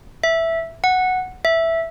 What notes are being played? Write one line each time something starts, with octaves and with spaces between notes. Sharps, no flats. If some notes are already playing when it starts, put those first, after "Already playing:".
E5
F#5
E5